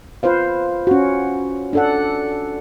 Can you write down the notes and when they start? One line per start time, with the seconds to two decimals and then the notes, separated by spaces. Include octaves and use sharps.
0.23 F4 B4 C5 F5
0.87 C#4 F#4
1.73 D4 A4 F#5